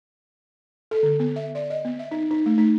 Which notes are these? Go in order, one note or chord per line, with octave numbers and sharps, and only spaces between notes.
A4
D3
B3
E5
D5
D#5
B3
E5
D#4
D#4
A3
D#4